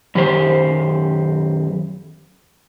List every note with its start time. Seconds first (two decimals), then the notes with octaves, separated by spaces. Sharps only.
0.15 F#2 D#3 G4 C5